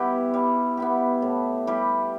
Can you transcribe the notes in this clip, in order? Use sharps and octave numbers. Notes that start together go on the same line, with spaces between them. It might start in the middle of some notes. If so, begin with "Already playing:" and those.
Already playing: G3 B3 E4 G4
G3
B3 E4 G4
A2
G3 E4 G4